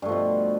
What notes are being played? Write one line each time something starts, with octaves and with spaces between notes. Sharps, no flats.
G2 B2 F3 A3